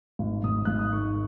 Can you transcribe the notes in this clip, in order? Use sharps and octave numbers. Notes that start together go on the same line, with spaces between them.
G#1
G#1 D#6
G#1 F#6
D#6
D#3 C#6